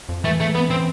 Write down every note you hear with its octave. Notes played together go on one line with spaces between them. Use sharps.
F2
E3 A3
A3
B3
C4